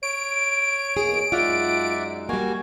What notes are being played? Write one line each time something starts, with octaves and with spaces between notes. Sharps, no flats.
C#5 D7
E2 B2 A#3 G#4
F#2 G#3 D#4 F4 D5 E5 F#5
G3 A#3 F#4 G#5